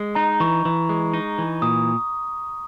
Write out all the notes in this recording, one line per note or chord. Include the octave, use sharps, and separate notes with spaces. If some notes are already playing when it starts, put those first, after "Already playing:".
Already playing: G#3
D#4 A#5
E3 C#6
E3
G#3
D#4
E3
A#2 D#6